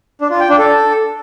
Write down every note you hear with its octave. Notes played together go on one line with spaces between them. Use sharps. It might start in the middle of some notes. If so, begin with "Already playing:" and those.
D4
F4
G5
D4
A4